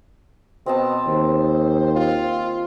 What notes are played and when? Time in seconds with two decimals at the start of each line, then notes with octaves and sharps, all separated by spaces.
0.66 B2 C4 D#5 A5
1.07 D#2 C5
1.96 F4